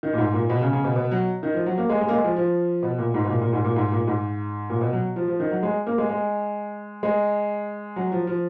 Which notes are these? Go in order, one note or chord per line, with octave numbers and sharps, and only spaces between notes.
D#3
A#2
G#2
A#2
B2
C#3
C#3
B2
B2
F#3
D#3
F3
F#3
A#3
G#3
G#3
A#3
G#3
F3
F3
B2
A#2
G#2
B2
A#2
A#2
G#2
A#2
G#2
A#2
G#2
A#2
B2
F#3
F3
F3
D#3
F#3
G#3
A#3
G#3
G#3
G#3
F#3
F3
F3